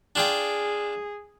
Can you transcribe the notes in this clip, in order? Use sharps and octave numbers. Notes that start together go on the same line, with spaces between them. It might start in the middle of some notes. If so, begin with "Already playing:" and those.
D4 F4 G#4 G5